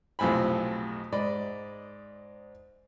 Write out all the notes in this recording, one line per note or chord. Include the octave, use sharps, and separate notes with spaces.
B1 F2 A2 C3 G#5 B5
G#2 D5 D#5 B5